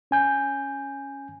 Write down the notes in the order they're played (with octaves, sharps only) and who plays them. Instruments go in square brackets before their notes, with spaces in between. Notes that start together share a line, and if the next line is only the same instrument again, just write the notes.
[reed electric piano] C#4 G#5 G6